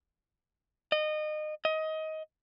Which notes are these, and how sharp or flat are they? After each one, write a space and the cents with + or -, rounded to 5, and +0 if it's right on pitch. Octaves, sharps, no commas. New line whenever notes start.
D#5 -25
D#5 +20